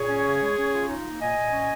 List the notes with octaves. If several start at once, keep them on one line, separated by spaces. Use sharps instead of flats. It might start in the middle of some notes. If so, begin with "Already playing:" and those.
Already playing: A#2 G#4 C#5
C#4
C#3
G#3
C#4
F4
D#4
A#3
A#2 D#5 G#5
A#2
C#4